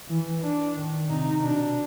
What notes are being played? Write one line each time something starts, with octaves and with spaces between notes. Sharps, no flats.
E3
D4
D#3
C3 D#4
B2 D4